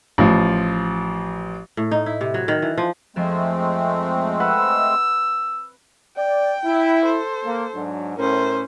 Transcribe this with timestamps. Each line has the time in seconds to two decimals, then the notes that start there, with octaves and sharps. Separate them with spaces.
0.18 A1 F3
1.77 A2
1.91 D#4
2.06 E4
2.21 C3
2.34 F#3
2.48 D#3
2.62 E3
2.78 F3
3.16 F2 F3 G#3 A3 C4
4.40 B4 F#5 E6
6.17 D5 G5
6.65 E4
7.05 A4 C5
7.44 A#3
7.75 G#2 F#3 D4
8.17 A2 C#4 A#4 C5